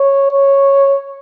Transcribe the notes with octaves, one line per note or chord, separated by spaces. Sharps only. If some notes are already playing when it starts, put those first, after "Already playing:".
Already playing: C#5
C#5